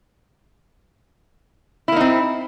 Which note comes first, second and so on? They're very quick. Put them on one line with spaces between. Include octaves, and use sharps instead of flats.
E4 A#3 D#4 C4